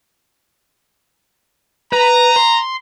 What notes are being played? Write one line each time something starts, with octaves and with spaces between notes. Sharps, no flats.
B4 A#5
C6